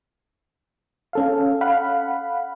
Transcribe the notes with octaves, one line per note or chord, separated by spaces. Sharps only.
C#4 A4 F5
F5 F#5 B5